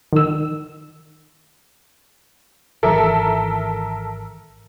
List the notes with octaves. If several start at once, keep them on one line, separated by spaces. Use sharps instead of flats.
D#3 E6
G#1 D#3 E3 A4 A#4 E5